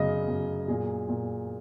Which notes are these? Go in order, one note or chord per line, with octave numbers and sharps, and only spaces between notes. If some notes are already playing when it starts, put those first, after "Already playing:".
Already playing: F#2 C#3 D#5
F#2
A#2 G#4
A#2